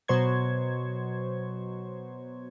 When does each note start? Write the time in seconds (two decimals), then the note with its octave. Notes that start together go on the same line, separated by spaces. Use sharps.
0.08 B2 F#3 C5 C#6 G#6